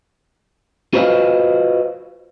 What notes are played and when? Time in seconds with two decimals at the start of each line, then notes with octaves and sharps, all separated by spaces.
0.93 F4 F#4 B4 C5 D#5 F5